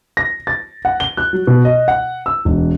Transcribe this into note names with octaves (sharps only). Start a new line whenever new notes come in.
A#6
A6
F#5
G7
F#6
F#3
B2
D#5
F#5
E6
E1